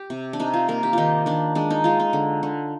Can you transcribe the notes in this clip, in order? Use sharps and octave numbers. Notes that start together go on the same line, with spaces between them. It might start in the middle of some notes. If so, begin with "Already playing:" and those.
Already playing: G4
C3
D4
C3 D#4
F4
A#3 A#4
G4
D#3 D#4 F4
D#3 D4
G#3 D4
D#4
G#3 F4
D#4
D3
D3